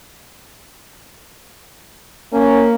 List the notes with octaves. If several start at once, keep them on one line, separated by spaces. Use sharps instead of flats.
A#3 C#4